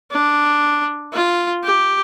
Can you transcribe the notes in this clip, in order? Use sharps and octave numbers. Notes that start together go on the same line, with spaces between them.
D4
F4
G4